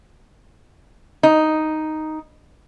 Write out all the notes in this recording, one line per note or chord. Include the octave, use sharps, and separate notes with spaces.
D#4